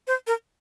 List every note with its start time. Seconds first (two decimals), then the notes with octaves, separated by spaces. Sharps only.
0.07 C5
0.27 A#4